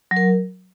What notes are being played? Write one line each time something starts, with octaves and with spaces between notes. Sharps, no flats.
F#3
A#4